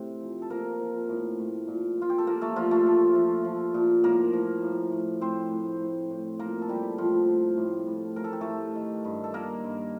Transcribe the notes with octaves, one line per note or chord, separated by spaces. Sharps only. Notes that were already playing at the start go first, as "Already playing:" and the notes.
Already playing: A2 C3 C4
F3
A4
F3 A#3 A#4
F3
A2
A2
A#2
A#2 F4
G4
A4
F3 A#3 A#4
A3 A4
A#2 F3 F4
A3 A4
F3
F3
F3
A#2
A2 A#3 A#4
F3
A2
A2
A2 C4 C5
A2
A2
A2
F3 A#3 A#4
A4
A2 G3 G4
A2 F3 F4
A2
A2
A2
A2 A#4
A4
G4
A2 A3 A4
D#3
G2
A4
D#3 A#3 A#4
G2